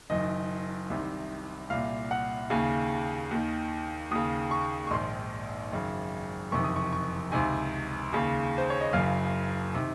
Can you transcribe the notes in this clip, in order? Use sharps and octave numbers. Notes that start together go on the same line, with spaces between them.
F#1 F#2 D#3 D#5
C2 C3 D#3
C2 A#2 F5
F#5
D#2 C#3 G#5
D#2 D#3
D#2 C#3 D#6
C#6
C#6
A#1 G#2 D#3 C6
G#1 F#2 C#3
F#1 F2 C3 D#3 C#6
D#6
C#6
C#6
C#2 C3 D#3 G#5
D#2 C#3
C5
C#5
D#5
F#1 F#2 C#3 F5
C3 D#3